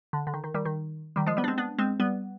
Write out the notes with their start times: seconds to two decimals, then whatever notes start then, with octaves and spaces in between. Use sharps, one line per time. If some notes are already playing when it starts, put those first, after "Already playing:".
0.13 D3
0.27 D3
0.34 D#3
0.44 D#3
0.54 D#3 G3
0.65 D#3
1.16 D#3 G3
1.26 F3 G#3
1.37 G3 B3
1.44 D4
1.48 G#3 C4
1.58 B3 D4
1.79 G#3 C4
2.00 G3 B3